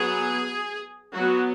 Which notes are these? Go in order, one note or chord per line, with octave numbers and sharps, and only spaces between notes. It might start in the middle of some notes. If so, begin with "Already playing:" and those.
Already playing: F#3 B3 G#4
F#3 B3 F#4